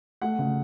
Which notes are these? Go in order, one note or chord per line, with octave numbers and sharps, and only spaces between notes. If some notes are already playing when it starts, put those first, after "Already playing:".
A3 F#5
C#3